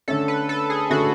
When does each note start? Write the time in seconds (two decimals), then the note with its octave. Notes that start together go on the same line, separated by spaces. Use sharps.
0.08 D3 A3 C#4 A4
0.28 B4
0.49 A4
0.70 G#4
0.90 D3 A3 C#4 F#4